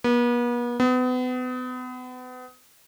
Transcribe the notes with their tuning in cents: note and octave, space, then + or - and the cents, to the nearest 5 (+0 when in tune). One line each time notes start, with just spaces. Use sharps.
B3 -40
B3 +35